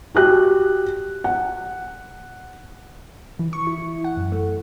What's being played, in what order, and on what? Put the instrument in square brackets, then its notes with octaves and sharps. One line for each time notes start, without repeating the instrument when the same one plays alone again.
[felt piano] F#4 G4 F#6
F#5
[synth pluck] E3
C#6
E4
F#5
F#2
A3